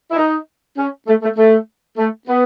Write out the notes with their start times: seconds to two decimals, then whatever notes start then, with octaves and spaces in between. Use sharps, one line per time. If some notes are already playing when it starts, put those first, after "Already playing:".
0.11 E4
0.16 D#4
0.76 C#4
1.07 A3
1.22 A3
1.37 A3
1.96 A3
2.27 B3